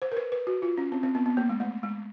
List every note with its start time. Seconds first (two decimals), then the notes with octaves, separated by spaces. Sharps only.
0.02 C5
0.12 A#4
0.17 B4
0.32 B4
0.47 F#4
0.62 F4
0.77 C#4
0.92 C4
1.03 C4
1.15 B3
1.26 B3
1.37 A#3
1.49 G#3
1.60 A3
1.83 G#3